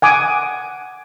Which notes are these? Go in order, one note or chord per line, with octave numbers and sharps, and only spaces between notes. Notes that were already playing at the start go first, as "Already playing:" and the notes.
F#5 G#5 D6 D#6